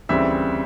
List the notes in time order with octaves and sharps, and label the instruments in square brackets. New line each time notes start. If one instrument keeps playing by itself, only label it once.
[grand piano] D2 C#3 E3 G3 C4 E5